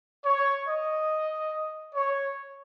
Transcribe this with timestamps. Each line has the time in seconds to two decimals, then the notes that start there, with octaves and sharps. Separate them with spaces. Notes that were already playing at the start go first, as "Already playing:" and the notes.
0.24 C#5
0.67 D#5
1.94 C#5